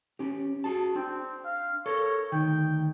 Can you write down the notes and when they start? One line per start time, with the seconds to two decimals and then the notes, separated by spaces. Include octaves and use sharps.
0.19 C#4 G4
0.64 F#4 G#4 A5
0.95 C4 D4
1.45 F5
1.86 A4 A#4 C#5
2.32 D2 D#3 G5